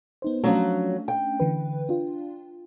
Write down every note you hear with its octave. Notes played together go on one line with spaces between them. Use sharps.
B3 D#4 C5
F3 F#3 A3 C#4 D4
G5
D3 E3 B4
D4 F4